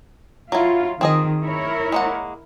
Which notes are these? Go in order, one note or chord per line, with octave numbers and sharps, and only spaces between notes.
F#3 E4 F4
D#3 C4 G#4 D#5
E4 A#4 C#5
G#3 A#3 F#5